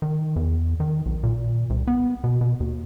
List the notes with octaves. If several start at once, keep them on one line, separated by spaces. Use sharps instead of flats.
D#3
E2
D#3
B1
A#2
C2
B3
B2
B2
D#2